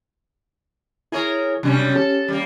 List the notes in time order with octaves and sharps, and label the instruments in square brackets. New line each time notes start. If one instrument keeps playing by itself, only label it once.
[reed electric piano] E4 [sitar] G#4 A#4 C#5
[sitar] F#2 G3 C#4 [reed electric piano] C3 D4
[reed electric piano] C#4 G4 [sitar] A4
[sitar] G3 A#3